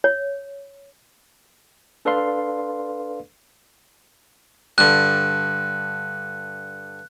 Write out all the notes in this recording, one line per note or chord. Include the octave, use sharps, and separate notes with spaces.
C#5
D4 A4 B4 D5 F5 C6
G2 D3 F#6